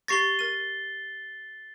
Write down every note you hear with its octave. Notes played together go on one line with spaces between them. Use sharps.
G4 C#6 A6 A#6 C7 G7
A#4 D#7